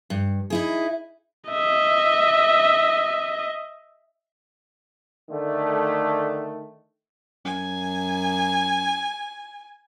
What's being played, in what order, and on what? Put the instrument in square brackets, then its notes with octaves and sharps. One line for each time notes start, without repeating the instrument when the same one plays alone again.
[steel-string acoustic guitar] G2
D#4 E4 G#4
[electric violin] D#5 E5
[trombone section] D3 D#3 A3
[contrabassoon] F#2 [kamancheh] G#5